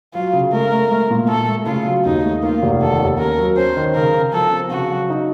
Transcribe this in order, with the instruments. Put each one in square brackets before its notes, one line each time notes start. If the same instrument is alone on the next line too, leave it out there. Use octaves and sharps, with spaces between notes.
[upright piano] F#3 [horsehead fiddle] F4
[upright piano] C#3
[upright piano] A3 [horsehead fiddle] A#4
[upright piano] A3
A3
A#2
[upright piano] A3 [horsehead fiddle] A4
[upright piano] A3
[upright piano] C#3 [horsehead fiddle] F4
[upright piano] F#3
[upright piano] D#2 [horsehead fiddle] D#4
[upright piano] A3
[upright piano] A#3 [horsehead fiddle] F4
[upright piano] F1
[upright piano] D#3 [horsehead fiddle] A4
[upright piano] D#2
[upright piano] C#4 [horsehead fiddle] A#4
[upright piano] F#3
[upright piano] C#4 [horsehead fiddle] C5
[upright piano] D#3
[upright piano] C#3 [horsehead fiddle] A#4
[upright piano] C#3
[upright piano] F3 [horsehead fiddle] A4
[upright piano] C4
[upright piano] C#3 [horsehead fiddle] F#4
[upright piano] F#3
D#4